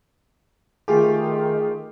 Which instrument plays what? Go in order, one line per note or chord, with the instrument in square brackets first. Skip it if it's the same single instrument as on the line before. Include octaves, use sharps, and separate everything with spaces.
[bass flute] D#3 [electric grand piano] A3 F4 G4 [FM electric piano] G#4